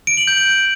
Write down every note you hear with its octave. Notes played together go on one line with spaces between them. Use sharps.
D7
F#7
G6
D7